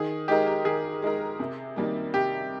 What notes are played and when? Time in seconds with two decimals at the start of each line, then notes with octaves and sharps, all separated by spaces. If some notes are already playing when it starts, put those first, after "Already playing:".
Already playing: D#3 G#4
0.28 G#3 D#4 G4 A#4
0.47 G4
0.65 D#3 G#4
1.02 G#3 D#4 A#4
1.40 C3
1.76 D#3 G3 A#3
2.13 C3 G4